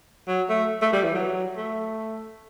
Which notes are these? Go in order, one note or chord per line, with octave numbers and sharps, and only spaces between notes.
F#3
A3
A3
G3
E3
F#3
A3